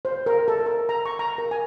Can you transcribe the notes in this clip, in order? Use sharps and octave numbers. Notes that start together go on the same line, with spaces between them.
C5
A#4
A4
A#4
A#5
C#6
A#5
A#4
G#5